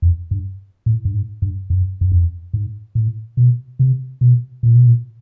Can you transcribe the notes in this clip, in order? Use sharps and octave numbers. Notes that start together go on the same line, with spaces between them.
F2
G2
A2
G2
G#2
G2
F#2
F#2
F2
G#2
A2
B2
C3
B2
A#2
B2
A#2